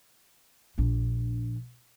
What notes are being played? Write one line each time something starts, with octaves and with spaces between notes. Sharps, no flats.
A#1 D4